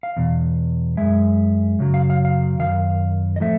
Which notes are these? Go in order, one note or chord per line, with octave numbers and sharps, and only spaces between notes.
F5
E2 B2
F#2 D#3 G#3 E5
F#2 C#3 F#3
F5
F5
F5
F#2 D#3 F5
D#5
A2 F3 A3 E5